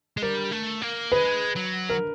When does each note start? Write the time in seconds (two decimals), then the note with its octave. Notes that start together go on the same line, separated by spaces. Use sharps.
0.17 G#3
0.22 G3 A#4
0.51 A3
0.82 A#3
1.12 G#3 B4
1.56 F#3
1.90 A#4